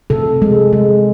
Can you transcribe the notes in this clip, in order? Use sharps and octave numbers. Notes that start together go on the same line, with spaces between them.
C3 A4
G#3
G#3